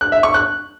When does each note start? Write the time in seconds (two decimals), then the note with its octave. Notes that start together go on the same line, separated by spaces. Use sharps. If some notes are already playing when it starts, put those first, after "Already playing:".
0.01 F#6
0.12 E5
0.23 C#6
0.34 F#6